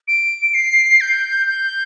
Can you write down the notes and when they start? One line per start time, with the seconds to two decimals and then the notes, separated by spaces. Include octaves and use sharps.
0.08 D7
0.54 C7
1.01 G6
1.47 G6